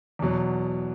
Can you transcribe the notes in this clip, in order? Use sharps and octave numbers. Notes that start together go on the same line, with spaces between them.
E2 B2 F#3